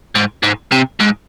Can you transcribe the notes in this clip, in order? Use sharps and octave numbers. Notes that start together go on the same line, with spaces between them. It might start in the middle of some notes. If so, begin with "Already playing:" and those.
G#2
G#2
C3
G#2